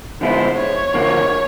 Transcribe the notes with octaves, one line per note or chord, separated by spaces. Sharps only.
D3 F3 G#3 B3 E4 C5
C#5
D#2 D3 F3 A#3